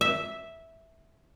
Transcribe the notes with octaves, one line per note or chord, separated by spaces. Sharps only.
E5